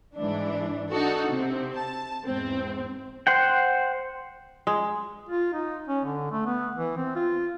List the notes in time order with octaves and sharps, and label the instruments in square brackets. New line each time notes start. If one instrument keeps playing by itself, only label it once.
[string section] G#2 E3 D4
D4 D#4 F#4 A4
C3 C4
A5
E2 G#2 C4
[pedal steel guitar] C5 F#5 G5
[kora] G#3
[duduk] F4
D#4
C#4
D3
A3
B3
E3
C4
F4